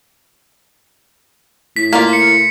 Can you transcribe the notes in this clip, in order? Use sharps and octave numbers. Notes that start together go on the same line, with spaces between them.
A2 B6
A#3 F4 B6
C#7